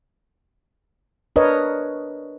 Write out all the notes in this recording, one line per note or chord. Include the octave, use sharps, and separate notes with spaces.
D4 A#4 B4 C#5 D#5